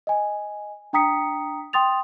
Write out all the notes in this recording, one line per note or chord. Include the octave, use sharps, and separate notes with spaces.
D#5 G#5
D4 G5 A#5 D#6 B6 C#7
G5 C6 D#6 A6 F7